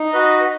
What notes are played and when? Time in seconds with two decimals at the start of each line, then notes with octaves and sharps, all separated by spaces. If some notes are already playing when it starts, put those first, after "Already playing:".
Already playing: D#4
0.12 F#4 B4 D#5